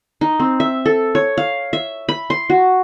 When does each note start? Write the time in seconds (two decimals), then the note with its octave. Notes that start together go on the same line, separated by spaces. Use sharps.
0.21 D#4
0.39 C4
0.60 E5
0.86 A4
1.15 C#5
1.37 F5
1.73 E5
2.09 B5
2.30 C6
2.50 F#4